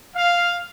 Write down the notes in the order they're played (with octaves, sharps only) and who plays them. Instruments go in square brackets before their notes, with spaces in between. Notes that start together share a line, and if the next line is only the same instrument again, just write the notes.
[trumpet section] F5